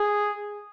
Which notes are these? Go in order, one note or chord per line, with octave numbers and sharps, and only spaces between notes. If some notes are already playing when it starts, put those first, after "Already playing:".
Already playing: G#4